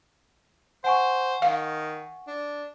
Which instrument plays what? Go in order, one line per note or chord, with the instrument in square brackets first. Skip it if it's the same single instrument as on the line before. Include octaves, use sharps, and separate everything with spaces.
[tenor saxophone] C5 [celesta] F#5 G#5 C#6
[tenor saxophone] D#3 [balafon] F5
[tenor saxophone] D4